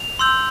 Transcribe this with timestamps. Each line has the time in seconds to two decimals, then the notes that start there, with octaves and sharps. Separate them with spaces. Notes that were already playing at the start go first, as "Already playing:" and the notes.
Already playing: F7
0.19 C6 E6 G6